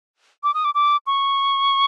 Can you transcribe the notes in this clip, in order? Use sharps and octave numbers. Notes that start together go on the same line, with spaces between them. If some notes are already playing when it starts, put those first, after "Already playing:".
D6
D#6
D6
D6
C#6